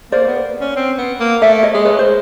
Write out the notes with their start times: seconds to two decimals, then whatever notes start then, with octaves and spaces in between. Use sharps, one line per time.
0.12 A#3 C5 D5
0.27 B3
0.61 C#4
0.76 C4
0.98 B3
1.20 A#3
1.42 A3 D5 E5
1.63 C#5 D#5
1.74 G#3
1.85 B4 C#5
1.99 C5